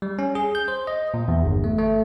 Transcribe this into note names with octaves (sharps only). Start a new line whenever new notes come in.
G3
C#4
G#4
G6
C5
D#5
A#2
E2
G1
A3
A3